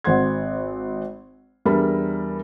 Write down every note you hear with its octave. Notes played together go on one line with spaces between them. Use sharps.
G#1 C4 F#5 C6 G#6
E2 G3 D4 A#4 E5 B5